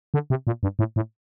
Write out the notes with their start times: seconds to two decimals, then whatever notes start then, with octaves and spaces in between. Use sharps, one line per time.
0.14 D3
0.30 C3
0.47 A#2
0.63 G2
0.79 A2
0.96 A2